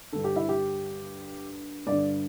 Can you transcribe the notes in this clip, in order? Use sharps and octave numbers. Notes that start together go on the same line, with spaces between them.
G2 D3 A4
G4
E4
G4
G2 D5
D3